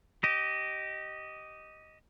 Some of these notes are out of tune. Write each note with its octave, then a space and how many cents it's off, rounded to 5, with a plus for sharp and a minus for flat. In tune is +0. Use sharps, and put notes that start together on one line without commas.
G4 -20 D#5 +0